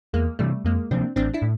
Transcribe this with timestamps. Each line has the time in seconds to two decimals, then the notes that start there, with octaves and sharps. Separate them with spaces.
0.14 E2 G#3 A#3
0.39 C3 E3 G3 A3
0.65 F2 G#3 A#3
0.91 C3 F3 A#3 C4 D4
1.16 A1 C4 D4
1.34 D4 E4
1.42 A2